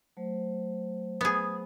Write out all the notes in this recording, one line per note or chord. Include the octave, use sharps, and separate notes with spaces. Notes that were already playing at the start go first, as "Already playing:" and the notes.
F#3 A3 C5
B3 G#4